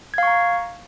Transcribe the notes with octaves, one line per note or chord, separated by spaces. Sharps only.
F5 A#5 C#6 G#6